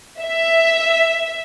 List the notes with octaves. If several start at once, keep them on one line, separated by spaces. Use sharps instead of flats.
E5